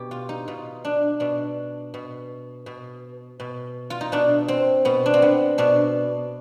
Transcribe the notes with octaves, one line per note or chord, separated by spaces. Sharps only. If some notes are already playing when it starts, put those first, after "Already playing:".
Already playing: B2 G4
F4
D#4
B2 F4
D4
B2 D4
B2
B2
B2
F4
D#4
B2 D4
C4
B2 B3
D4
C4
B3
B2 D4